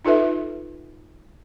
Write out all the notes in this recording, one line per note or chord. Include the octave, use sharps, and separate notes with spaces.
D#4 F4 A4 B4 E5